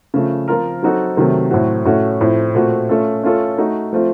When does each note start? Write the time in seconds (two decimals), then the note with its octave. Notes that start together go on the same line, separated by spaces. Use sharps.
0.14 C#3 F3 A3
0.48 F3 C4 F4 A#4
0.83 F#3 C4 D#4 F#4 A4
1.17 C3 D#3 F#3 A3
1.51 A2 F#3 A3 C4 F#4
1.85 A2 A3 C#4 F#4
2.21 A2 F3 C4
2.55 A#2 A3 C4 F#4
2.89 A3 C#4 F4 A4
3.23 A3 C#4 F4 A4
3.58 A3 D#4 F#4
3.93 F3 A3 C4 F4